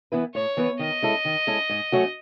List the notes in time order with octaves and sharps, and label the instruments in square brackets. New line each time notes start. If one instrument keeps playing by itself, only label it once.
[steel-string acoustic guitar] E3 B3 E4 B4
[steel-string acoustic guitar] A2 [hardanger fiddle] C#5
[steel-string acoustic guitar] E3 B3 E4 B4
[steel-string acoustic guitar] D#3 [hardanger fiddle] D#5
[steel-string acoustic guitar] G#3 C#4 E4 A4
D#3
G#3 C#4 E4 A4
G#2
F#3 A3 C#4 F#4